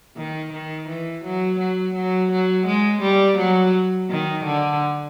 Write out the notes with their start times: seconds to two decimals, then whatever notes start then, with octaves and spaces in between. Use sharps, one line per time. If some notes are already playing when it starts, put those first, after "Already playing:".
0.16 D#3
0.52 D#3
0.88 E3
1.24 F#3
1.59 F#3
1.94 F#3
2.31 F#3
2.66 G#3
3.01 G3
3.37 F#3
4.10 D#3
4.44 D3